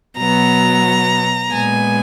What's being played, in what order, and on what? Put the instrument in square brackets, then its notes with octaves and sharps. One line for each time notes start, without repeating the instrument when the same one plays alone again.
[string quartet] B2 F#3 B3 A#5
A#2 G#3 B3 G#5